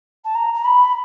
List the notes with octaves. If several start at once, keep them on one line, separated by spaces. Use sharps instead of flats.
A5
A#5
A#5
B5